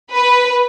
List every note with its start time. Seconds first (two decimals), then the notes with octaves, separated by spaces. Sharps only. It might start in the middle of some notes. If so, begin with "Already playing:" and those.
0.11 B4